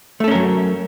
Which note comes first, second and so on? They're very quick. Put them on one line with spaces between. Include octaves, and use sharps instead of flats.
A3 A4 C#4 A#4 F#3